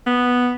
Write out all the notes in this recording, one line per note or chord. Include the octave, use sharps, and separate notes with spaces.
B3